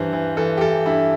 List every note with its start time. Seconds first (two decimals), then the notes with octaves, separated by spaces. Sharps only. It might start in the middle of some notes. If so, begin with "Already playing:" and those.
Already playing: G2 E3 C5
0.13 E3
0.37 E3 A4
0.57 G4
0.61 E3 A4
0.86 G2 E4